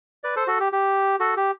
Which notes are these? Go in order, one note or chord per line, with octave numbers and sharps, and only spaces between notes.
B4 D5
A4 C5
F#4 A4
G4
G4
F#4 A4
G4